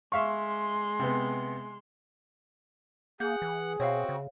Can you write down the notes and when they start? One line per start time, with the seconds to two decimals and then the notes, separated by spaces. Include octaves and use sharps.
0.12 G#3 E5 F5 C6 C#6
0.99 C3 B3
3.20 A#3 G#4 F#5 G6
3.42 E3
3.80 B2 C4 F#4 C#5 E5 F5
4.09 C#3